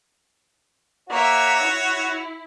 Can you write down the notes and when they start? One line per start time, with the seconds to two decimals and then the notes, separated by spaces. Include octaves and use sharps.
1.10 A#3 F#4 C#5 E5
1.63 E4